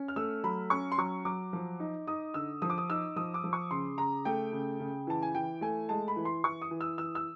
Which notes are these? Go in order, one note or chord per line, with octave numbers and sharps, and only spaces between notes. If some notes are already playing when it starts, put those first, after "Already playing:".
Already playing: C#4
F6
A3 E6
F#3 B5
C#4 C#6
C6
F#3 C#6
F#3 D6
F3
D#4
D#4 D#6
D3 E6
F3 D#6
D6
D#6
D#4 E6
F3 D#6
D6
F3
C#6
C#3 C6
C#3 A#5
A3 G5
C#3
C#3
E3 A5
G#5
E3 G5
A3 G#5
G#3 A5
B5
E3
C6
E3 C#6
D#6
E3
E6
E3 E6
E6